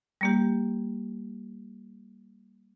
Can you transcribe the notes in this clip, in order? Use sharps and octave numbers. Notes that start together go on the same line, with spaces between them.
G3 A#3 G4